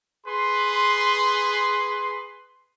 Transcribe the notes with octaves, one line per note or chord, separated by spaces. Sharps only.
G#4 B4 C6